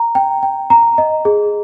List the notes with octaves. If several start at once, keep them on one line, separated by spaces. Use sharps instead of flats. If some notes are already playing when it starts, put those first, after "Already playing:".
Already playing: A#5
G5
G5
A#5
D#5
G#4